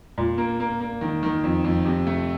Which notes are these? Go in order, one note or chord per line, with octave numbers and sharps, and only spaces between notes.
A#2
A#3
A#3
A#3
D#3
D#3
F2
F2
C3
A3